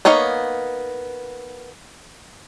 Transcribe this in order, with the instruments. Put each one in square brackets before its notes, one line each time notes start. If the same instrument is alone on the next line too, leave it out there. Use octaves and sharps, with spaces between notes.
[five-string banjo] A#3 B3 D#4 C#5 F5